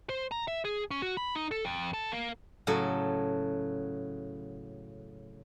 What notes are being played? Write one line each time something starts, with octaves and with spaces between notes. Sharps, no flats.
C5
A#5
E5
G#4
C#4
F#4
B5
D#4
A4
F2
A4
A#3
A2 C#3 F#3 A4